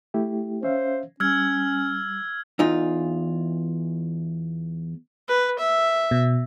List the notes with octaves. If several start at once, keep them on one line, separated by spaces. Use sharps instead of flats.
A3 E4 G4
C#4 C5 E5 F5
G3 C#4 E6 F6 G#6
E2 E3 D#4 F4
B4
E5
B2